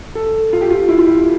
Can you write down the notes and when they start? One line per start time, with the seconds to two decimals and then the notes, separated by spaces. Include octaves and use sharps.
0.15 A4
0.53 F4
0.61 G4
0.70 F4
0.88 E4
0.98 F4
1.06 E4